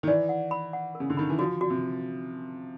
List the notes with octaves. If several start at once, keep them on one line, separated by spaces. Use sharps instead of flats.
D#3
E3 D5
F#5
B5
F#5
A#4
C#3
D3
D#3 B5
E3
F3 F#4
F#4
C3